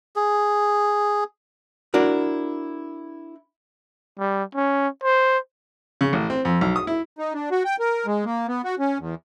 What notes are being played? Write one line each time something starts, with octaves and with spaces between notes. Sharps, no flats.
G#4
D4 E4 F#4 A#4
G3
C#4
C5
C#3
A1
C4
F2
B1
D#6
E4
D#4
D4
F#4
G5
A#4
G#3
A#3
B3
F#4
C#4
E2